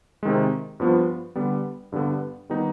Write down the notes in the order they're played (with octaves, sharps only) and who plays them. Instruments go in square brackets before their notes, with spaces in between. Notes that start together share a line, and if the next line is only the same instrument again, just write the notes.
[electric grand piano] C3 D#3 G#3
G2 F3 B3 F4
D3 G3 B3
G2 D3 G3 B3
D#3 G3 B3 D#4